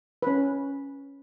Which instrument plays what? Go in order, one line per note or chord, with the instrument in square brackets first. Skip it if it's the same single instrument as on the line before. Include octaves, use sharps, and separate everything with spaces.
[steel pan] C#4 B4